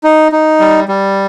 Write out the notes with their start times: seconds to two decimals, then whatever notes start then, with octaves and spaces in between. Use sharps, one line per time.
0.04 D#4
0.32 D#4
0.60 G3
0.88 G3